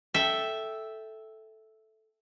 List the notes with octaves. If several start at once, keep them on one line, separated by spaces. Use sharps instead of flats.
A4 E5 G5